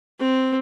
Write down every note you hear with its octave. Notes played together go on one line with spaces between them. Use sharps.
C4